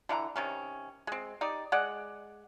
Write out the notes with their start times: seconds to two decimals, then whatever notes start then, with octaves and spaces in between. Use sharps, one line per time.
0.09 D3 E3 F5 A#5
0.36 C3 D#3 C#4
1.07 G#3 C4
1.41 D#4 G4 D5
1.72 G#3 D5 F#5